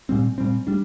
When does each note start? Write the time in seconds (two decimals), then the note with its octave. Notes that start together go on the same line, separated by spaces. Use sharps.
0.09 A#2 G3 C4
0.38 A#2 G3 C4
0.67 G3 D4